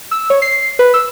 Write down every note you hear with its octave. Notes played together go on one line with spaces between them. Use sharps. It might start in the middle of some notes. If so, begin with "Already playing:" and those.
E6
C#5
C7
B4
E6